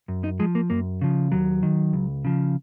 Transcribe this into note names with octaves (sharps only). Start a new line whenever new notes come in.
F#2
D#4
F3 G#3
A#3
F#2 A#3
C#3 F3
D#2 F#3
D#3
C#2
C#3 F3